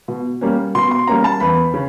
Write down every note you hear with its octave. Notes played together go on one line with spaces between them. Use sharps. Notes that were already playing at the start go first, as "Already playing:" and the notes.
B2
G3 A#3 C#4
B2 C6
C6
G3 A#3 C#4 A#5
A5
E2 B5
C#3